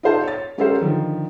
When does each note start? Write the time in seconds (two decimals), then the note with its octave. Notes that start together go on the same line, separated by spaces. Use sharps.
0.03 D#4 F4 A4 C5 F5 A5
0.23 C#5 A6
0.58 G#3 C#4 G4 A4 A#4 C5
0.81 D3 D#3 F3